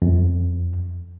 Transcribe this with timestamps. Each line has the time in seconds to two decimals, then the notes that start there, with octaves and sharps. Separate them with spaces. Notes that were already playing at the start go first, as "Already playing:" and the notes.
0.02 F2